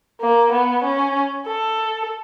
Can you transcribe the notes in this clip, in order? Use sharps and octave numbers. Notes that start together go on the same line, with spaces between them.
A#3
B3
C#4
A4